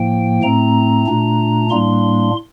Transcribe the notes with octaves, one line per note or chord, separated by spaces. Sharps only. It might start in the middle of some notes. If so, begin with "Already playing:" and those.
Already playing: A2 F3 A#3 G5
A2 A3 C4 A#5
A#2 A3 D4
A2 G3 A#3 D4 C6